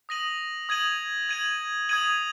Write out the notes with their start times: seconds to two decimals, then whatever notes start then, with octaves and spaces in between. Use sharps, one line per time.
0.09 D#6 A#6 D#7 F#7
0.69 D#6 G#6 D#7 F#7
1.29 G#6 D#7 F#7
1.89 D#6 G#6 D#7 F#7